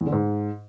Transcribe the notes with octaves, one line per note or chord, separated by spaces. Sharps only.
E2
D3
G#2